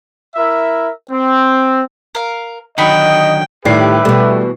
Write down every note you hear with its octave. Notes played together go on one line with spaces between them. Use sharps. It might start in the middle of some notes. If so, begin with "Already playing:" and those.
E4 A#4 E5
C4
A#4 F5
D3 D#3 F#3 D#4 F#4 D#5 G5 B5
A2 D#3 G3 G4 B4 E5 C7
B2 E3 G3 A3 B3